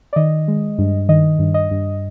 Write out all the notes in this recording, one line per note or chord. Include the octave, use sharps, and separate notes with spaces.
D5
D#3 D#5
G#3
G2
D#3 D#5
G2
D#5
G2